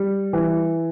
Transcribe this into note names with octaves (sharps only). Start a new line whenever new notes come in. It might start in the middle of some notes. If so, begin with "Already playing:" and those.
Already playing: G3
E3